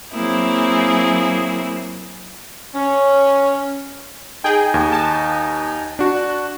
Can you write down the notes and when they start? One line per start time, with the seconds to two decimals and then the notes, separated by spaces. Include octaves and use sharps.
0.13 F#3 A#3 C4 E4 G#4
2.75 C#4
4.44 D#4 G#4 G5 G#5
4.74 D#2
4.92 A5
5.99 D4 F#4